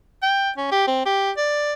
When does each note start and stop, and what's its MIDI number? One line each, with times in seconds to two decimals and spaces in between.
0.22 0.50 79
0.57 0.68 61
0.72 0.85 67
0.88 1.04 60
1.06 1.31 67
1.37 1.74 74